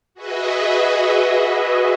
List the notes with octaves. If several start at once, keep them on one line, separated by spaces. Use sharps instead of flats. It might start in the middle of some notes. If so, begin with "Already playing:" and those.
F#4 G#4 B4 D#5 E5